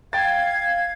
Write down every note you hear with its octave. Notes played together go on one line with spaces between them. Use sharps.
F5 G5 G#6 A6